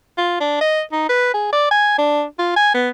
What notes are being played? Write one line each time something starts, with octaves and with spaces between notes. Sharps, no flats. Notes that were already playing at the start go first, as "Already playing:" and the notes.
F4
D4
D#5
D#4
B4
G#4
D5
G#5
D4
F4
G#5
B3